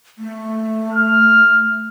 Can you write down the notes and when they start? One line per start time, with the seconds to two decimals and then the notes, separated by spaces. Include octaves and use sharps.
0.18 A3
0.93 F6